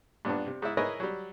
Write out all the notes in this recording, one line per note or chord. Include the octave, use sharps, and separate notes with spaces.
G2 A#2 B3 D4
C3
G#2 E4
E4 G#4 A#4 B4 C#5 D#5
F#3 G3